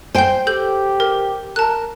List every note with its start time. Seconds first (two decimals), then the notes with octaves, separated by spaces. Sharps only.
0.15 C5 G5 G#5 G6
0.47 G4 A4 G6
1.00 A#4
1.56 A#4 A5 F#6